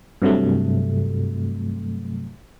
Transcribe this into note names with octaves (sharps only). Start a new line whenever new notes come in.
G2 C3 F#3 A3